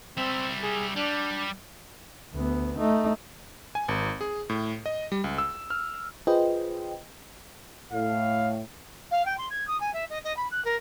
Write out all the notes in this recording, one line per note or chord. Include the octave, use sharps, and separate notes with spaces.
G3 C4 E5
G#4
G3 D4
D2 B3
A3 D#4
G#5
G#1
G#4
A2
D#5
G3
C#2
E6
F6
F4 G#4 B4 C5 D#5 G5
A2 F5
F5
G5
C6
G#6
D#6
G#5
E5
D#5
D#5
B5
F#6
A#4